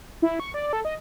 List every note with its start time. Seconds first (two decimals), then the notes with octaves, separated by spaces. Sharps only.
0.22 E4
0.40 C#6
0.54 D5
0.73 A4
0.85 D#5